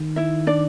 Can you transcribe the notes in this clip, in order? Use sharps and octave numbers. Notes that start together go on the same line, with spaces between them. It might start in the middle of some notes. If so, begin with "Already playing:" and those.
Already playing: D#3
E4 E5
D4 D5